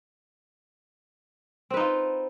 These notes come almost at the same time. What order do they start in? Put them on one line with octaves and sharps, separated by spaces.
C4 B4 D#4 F4